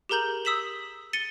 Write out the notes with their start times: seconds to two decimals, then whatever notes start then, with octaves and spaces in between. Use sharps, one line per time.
0.09 G4 G#4 A#4 A#5 G6 F#7
0.45 D#6 E6 B6 E7 F#7
1.13 A6 C#7 D#7 G7